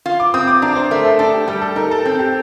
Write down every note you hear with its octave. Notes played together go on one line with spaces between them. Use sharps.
F4
D6
C4 D#6
D6
D4 A#5
C5
A3 A#4
A4
D4 A4
G4
G3 A4
A4
D#4 A#4
A4
C4
G4